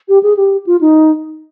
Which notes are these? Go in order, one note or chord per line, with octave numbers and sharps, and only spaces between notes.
G4
G#4
G4
F4
D#4